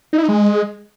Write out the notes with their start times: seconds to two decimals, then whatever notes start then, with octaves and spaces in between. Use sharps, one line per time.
0.13 D#4
0.18 E4
0.23 D#4
0.28 G#3